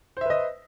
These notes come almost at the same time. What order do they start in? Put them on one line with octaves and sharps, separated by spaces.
C5 E5 B4 D#5